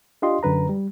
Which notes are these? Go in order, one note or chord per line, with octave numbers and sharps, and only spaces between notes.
D4 F4 G4 D#5 C6
F#2 D3 B4 A#5
G3